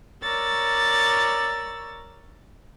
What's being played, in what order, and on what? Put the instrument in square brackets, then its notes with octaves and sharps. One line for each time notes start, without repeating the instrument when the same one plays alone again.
[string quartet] A#4 C#5 D5 E6 A6